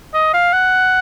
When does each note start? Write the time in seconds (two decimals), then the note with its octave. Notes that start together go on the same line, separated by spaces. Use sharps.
0.14 D#5
0.34 F5
0.53 F#5